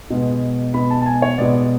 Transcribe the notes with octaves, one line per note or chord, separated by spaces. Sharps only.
B2 G#3 B3
B2 G#3 B3 B5
A5
A5
G#5
C#5
B2 G#3 B3 D5